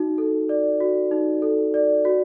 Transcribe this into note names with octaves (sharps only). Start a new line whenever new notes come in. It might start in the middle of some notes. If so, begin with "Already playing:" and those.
Already playing: D#4 F#4
A4
D5
F#4
D#4
A4
D5
F#4